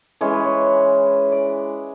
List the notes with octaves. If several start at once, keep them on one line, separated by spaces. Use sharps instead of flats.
E3 G#3 C#4 C#5
B4
C#5
D5